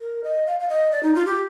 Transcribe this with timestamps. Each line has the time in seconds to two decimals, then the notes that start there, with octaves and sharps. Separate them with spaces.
0.01 A#4
0.24 D#5
0.47 F5
0.60 F5
0.69 D#5
0.92 D5
1.03 D#4
1.15 F4
1.26 G4